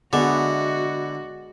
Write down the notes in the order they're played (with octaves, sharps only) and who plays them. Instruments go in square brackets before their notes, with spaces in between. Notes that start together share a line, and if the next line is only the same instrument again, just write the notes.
[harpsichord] D3 [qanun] G#3 B3 E5 [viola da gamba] F#4